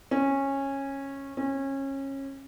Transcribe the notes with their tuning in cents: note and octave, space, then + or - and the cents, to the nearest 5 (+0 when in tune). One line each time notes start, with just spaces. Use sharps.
C#4 -15
C#4 -25